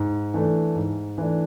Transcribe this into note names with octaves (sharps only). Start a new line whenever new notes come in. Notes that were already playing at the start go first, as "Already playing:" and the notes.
Already playing: G#2
E3 A3 D4
G#2
E3 A3 D4